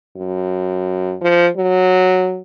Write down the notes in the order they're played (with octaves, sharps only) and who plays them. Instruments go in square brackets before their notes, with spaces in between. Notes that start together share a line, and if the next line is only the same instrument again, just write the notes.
[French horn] F#2
F3
F#3